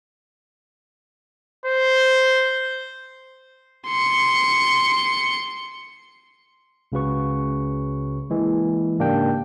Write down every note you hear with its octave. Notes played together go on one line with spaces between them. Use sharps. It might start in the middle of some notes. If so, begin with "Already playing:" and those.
C5
C6 C#7
C#2 C#3 F#4 B4 C#6
E3 G#3 A#3
G#2 C#3 A#3 D4 G4 G5